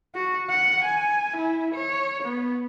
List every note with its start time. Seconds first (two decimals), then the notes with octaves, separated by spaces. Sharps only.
0.15 F#4
0.50 F#5
0.84 G#5
1.36 E4
1.74 C#5
2.23 B3